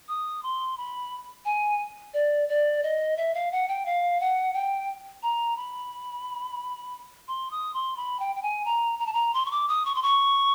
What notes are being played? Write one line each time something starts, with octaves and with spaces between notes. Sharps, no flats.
D#6
C6
B5
G#5
D5
D5
D#5
E5
F5
F#5
G5
F5
F#5
G5
A#5
B5
C6
D#6
C6
B5
G5
G5
G#5
A#5
A#5
A5
A#5
C6
C#6
D6
D#6
C#6
C6
C#6